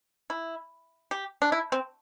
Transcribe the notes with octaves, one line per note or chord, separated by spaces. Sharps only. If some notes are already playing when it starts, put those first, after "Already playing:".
E4
G4
D4
E4
C4